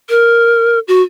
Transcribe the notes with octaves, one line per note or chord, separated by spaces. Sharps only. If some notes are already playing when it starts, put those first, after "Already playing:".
A#4
F#4